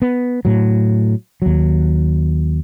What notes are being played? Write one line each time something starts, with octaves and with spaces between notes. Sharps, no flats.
B3
A2 F#3
D#2 F#3